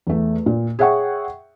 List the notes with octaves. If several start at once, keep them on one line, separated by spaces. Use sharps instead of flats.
E2 A3
A#2
G#4 C#5 E5 F#5 G5 C#6